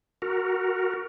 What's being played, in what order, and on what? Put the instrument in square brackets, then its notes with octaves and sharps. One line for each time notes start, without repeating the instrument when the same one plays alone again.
[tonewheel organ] F#4 A#4